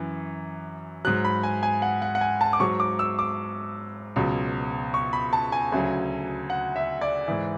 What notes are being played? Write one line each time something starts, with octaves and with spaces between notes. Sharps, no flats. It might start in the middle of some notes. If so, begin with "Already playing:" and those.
Already playing: F#2 E3
G#2 F#3 F#6
B5
G#5
G#5
F#5
F#5
F#5
G#5
A5
D6
G#2 F#3 C#6
D6
E6
D6
C#2 B2 F#3
C#6
B5
A5
G#5
D2 C#3 F#3
F#5
E5
D5
G#2 E3